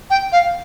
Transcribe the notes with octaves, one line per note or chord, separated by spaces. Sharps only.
G5
F5